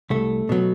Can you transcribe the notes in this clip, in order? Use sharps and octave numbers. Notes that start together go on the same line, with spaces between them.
C2 A3
B2 F#3